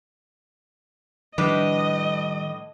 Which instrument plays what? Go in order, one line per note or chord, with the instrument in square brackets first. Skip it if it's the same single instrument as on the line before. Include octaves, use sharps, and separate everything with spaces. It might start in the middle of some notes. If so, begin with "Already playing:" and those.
[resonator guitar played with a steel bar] A2 D4 B4 [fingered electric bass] D#3 F3 G3 [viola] D#5